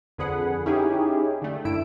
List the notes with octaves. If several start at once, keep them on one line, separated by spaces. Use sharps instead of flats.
F2 D3 G#4 B4 F#5
C#4 D#4 E4 G4 G#4
D3 A3
G2 E4 E6 D7